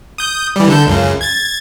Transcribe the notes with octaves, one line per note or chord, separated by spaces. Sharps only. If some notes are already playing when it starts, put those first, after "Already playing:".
D#6 G6
E3 G3
D3 A4 G6
C#2 F#2 C#3
G#6 A6